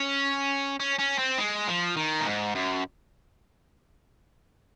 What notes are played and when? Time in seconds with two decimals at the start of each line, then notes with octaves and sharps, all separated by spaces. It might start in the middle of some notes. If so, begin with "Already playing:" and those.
Already playing: C#4
0.80 C#4
0.99 C#4
1.19 C4
1.38 G#3
1.68 F3
1.97 D#3
2.21 A#2
2.26 G#2
2.55 F#2